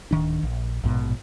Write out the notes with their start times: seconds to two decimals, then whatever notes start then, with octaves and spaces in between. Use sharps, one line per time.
0.11 D1 D#3 D4
0.43 A#1
0.83 A#1 G#2 B2